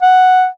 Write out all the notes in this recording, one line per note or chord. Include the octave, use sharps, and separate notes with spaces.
F#5